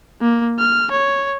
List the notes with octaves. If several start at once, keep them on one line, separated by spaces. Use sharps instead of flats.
A#3
F6
C#5